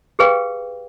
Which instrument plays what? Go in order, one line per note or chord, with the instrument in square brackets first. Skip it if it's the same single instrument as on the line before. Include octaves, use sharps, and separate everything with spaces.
[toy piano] G4 G#4 B4 F5 G5